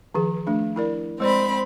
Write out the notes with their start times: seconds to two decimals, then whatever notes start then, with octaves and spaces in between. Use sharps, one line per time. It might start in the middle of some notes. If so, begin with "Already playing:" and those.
0.15 D#3 F3 G#4
0.47 A3 D4
0.76 E4 A#4 D5
1.20 G#3 C4 C5 D5 B5